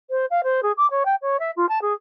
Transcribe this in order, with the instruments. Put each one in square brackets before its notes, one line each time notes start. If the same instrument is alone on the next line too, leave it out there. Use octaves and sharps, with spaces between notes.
[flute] C5
F5
C5
G#4
D6
C#5
G5
C#5
E5
F4
A5
G#4